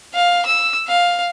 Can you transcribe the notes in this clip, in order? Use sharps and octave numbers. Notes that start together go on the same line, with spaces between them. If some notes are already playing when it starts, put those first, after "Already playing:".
F5
E6
F5